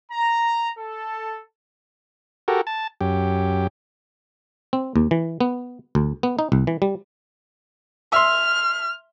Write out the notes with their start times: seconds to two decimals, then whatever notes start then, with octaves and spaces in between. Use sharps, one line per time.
0.12 A#5
0.79 A4
2.48 F#4 G4 A4 A#4
2.67 A5
3.01 F#2 G4
4.73 C4
4.96 D#2
5.11 E3
5.41 B3
5.95 D2
6.23 B3
6.39 D#4
6.52 C2
6.67 E3
6.82 G3
8.13 E5 C6 F6